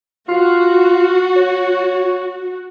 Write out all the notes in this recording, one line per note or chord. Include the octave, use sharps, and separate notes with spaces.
F4 F#4
C#5